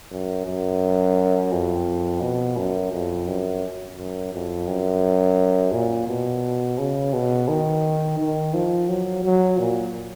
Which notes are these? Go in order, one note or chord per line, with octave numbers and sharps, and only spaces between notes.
F#2
F#2
F2
B2
F#2
F2
F#2
F#2
F2
F#2
A#2
B2
C#3
B2
D#3
D#3
F3
F#3
F#3
A#2